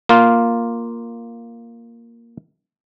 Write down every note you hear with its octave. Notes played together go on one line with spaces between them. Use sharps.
A#3 F4